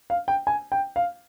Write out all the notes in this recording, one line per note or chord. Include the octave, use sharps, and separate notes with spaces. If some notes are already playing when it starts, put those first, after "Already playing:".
F5
G5
G#5
G5
F5